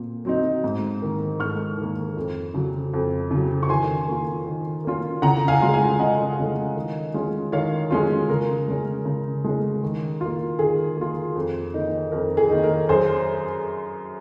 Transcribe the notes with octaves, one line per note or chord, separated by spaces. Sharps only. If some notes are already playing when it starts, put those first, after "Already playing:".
Already playing: A#2 C4
F#3 C4 D#4
G#2
D#3 A#3
G#2 C#6 F6
D#3 A#3
F2
C#3 F#3
F2
C#3 F#3
C#6
D#3 G#5 C6
A#3 C#4 F4
D#3
A#3 C#4 F4
C#3 F#5 A#5
F5 G#5
G#3 C#4 F4
F5 G#5
C#3 D#5 F#5
G#3 C#4 F4
D#3
G#3 C#4 F4
D#3 C#5 F5
G#3 C#4 F4
C#3 A#4
G#3 C#4
C#3
G#3 C#4
D#3
A#3 F4
D#3 G#4
A#3 F4
F2
D#3 A#3 D#4
F2 A#4
G#4
D#3 A#3 D#4
A#4
F#2 G#4 C5